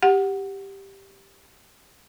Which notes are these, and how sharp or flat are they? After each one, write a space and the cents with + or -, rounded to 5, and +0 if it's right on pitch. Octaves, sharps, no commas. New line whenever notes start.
G4 +0 F#5 +0